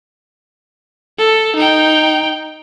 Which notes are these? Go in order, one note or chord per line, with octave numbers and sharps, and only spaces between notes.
A4
D#4 G5